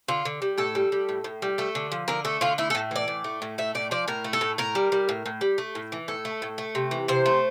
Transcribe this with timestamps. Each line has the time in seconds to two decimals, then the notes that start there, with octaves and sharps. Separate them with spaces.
0.08 D3 F4
0.25 D3
0.42 G3
0.58 A2 A4
0.75 G3
0.92 G3
1.09 A2
1.24 A2
1.42 G3
1.58 A3 A4
1.75 D3
1.92 F3
2.08 D3 A#4
2.25 A3 A4
2.41 D3 F4
2.58 A3 E4
2.70 A4
2.75 A2
2.91 E3 D5
3.08 A2
3.24 A3
3.42 A2
3.58 A3 E5
3.75 A2 D5
3.91 F3 D5
4.08 A2 A#4
4.24 A3
4.33 A4
4.41 A2
4.58 A2 A#4
4.75 G3
4.92 G3
5.09 A2
5.26 A2
5.41 G3
5.58 A3
5.75 A2
5.92 E3
6.08 A2 A4
6.25 A3
6.42 A2
6.58 A3
6.75 C3
6.91 E3
7.08 C3 C5
7.26 A3